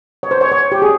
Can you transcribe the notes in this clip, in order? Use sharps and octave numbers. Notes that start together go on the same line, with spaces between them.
C#5
C5
C#5
C#5
G4
G#4